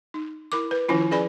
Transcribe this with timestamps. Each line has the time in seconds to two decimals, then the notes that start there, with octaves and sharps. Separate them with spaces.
0.14 D#4
0.52 E4 A#4 D6
0.71 B4
0.89 D#3 F3 C#4 E4 F4
1.11 C#4 G#4 B4 D5 G#5 B5